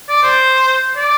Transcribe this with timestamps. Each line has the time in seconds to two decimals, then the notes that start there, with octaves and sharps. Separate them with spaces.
0.09 D5
0.23 C5
0.97 D5